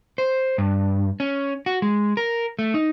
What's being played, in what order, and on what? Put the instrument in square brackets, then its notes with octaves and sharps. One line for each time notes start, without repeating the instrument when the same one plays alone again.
[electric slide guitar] C5
G2
C#4
F#4
G#3
A#4
A3
D#4